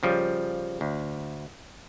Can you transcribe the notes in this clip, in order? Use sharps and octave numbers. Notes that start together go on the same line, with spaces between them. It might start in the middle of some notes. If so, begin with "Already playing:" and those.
C#3 F3 G3
D2